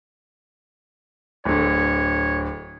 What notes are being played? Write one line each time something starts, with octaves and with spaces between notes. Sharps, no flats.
D1 D3 C#5